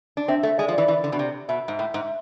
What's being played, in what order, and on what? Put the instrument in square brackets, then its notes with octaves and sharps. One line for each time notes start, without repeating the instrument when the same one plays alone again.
[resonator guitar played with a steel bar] D4
[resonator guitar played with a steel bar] C4 [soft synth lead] E5
[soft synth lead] E5
[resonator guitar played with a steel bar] A3
[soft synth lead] E5
[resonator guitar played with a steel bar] G#3 [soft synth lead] D5
[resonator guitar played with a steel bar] F3
[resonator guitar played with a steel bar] E3 [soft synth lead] D5
[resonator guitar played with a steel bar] E3
D3
B2
C3
[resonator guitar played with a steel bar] B2 [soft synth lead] E5
[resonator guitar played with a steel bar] G#2
A2
G#2